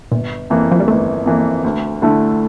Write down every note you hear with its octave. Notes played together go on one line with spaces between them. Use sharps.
G1 A#2
F2 E3 A#3
F3
G3
G1 A3
F2 E3 A#3
D2
D3 A3 E4 A4